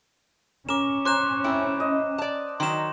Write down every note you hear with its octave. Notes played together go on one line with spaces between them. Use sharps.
C#4 A#4 D6 E7
C5 A#5 D6 F#6 E7
A3 C4 E4 G5
D#5
D5 A5
D#3 F#3 D#4 C6 E7